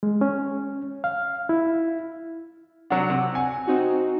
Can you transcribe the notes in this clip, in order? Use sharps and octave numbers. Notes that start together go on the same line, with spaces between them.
G#3
C#4
F5
E4
C3 F#3 D4 F#5
C3
G#5
C4 D#4 F#4